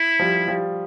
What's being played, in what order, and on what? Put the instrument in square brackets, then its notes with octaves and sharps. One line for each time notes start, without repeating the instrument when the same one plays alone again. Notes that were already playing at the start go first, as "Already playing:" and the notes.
Already playing: [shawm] E4
[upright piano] F3 G3
F3 G3